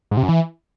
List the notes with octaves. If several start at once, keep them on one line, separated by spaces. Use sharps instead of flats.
G#2
C3
F#2
E3